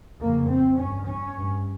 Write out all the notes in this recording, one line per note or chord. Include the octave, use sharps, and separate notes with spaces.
F2 C#3 A#3
C4
G2 C#4
C#4
G2